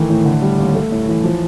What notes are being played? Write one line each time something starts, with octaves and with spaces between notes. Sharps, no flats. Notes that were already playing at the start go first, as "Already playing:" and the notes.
Already playing: D#3 E3 A3
A2
D3
G3
D#2
A3
A2
E3
F3